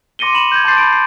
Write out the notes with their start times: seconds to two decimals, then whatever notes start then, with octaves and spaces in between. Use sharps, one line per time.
0.19 C6 D6 A#6 C#7 D#7 G7
0.34 B5 E7 F#7
0.52 G6 G#6
0.64 A5 C6 D6 G6 A6 C7
0.77 B5 D7
0.93 C7